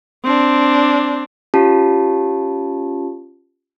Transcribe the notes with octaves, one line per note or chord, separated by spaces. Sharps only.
C4 D4
C#4 F4 G4 A5